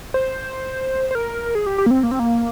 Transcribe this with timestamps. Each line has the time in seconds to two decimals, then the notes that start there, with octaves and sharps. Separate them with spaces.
0.14 C5
1.11 C5
1.15 A#4
1.55 G#4
1.66 G4
1.78 G4
1.86 A#3
1.91 C4
2.03 A#3
2.11 C4
2.19 A#3